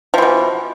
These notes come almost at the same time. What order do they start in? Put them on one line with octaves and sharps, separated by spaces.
F3 E3 B2